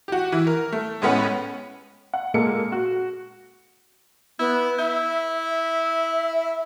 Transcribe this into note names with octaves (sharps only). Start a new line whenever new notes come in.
F#4 G4
E3 E4
A#4
A3
A2 G#3 B3 C#4 B4 F#5
F#5
A#2 G#3 A#3 A4 C#7
F#4
B3 E4
E4 E5
E5